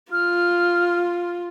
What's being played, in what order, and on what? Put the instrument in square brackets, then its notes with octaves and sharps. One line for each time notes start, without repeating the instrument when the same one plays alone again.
[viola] F4 [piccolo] F6